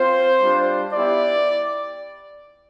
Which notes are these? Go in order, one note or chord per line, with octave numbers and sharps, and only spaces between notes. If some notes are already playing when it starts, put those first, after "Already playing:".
Already playing: C4 F4 C5
G3 D4 F4
B3 E4 G4 D5